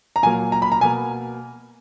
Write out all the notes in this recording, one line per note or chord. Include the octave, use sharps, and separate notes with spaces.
A#5
A#2 F#3 A#3 G#5
A#5
B5
A#5
B2 A#3 G#5